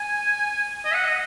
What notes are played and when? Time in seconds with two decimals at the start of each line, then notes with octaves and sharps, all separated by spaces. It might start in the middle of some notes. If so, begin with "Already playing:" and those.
Already playing: G#5
0.85 D#5
0.94 F#5
1.04 D#5